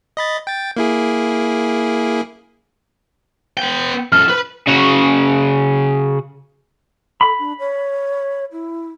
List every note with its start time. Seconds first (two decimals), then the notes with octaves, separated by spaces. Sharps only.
0.17 D#5 B5 A6
0.47 G5 A6
0.76 A#3 E4 G#4
3.57 B3 G5
4.12 F#2 A4 F6
4.29 B4 B5
4.67 C#3 F#4
7.21 A4 B5
7.39 D4
7.59 C#5
8.52 E4